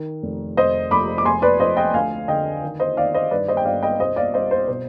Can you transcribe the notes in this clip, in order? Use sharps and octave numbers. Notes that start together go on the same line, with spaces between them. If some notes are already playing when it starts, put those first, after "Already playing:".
Already playing: D#3
F1
F1 C5 D#5
F1 B5 D6
D6
F1 G#5 C6
B4 D5
F2 C5 D#5
D#5 G5
D2 F5 G#5
D3 D#5 G5
D#3
C5 D#5
D#3 D5 F5
C5 D#5
G2 B4 D5
C5 D#5
G5
G1 D5 F5
D#5 G5
C2 C5 D#5
D5 F5
C2 C5 D#5
C5
B2 C5